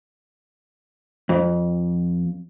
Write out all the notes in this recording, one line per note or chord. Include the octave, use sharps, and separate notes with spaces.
F2